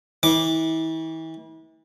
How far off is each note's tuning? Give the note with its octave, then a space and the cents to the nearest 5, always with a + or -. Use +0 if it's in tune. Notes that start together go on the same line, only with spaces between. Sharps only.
E3 -35 D6 +0